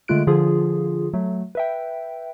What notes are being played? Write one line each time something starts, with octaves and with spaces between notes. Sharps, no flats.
D3 G#3 A3 F4 F#6 D7
D3 F3 F4 G#4
F#3 A3
B4 E5 G5